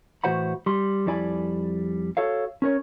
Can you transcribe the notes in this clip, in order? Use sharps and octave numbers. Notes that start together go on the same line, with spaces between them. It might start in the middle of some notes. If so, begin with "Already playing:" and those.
A2 E3 F#4 C5 F#5 B5
G3 C6
F2 G3 E4 D5 G#5 B5
F#4 A4 C#5 F5
C#4 A#4 C#5